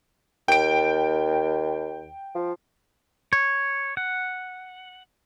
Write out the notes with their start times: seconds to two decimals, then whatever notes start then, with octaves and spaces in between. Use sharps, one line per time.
0.48 D#2 G5 D7
2.35 F3
3.33 C#5
3.97 F#5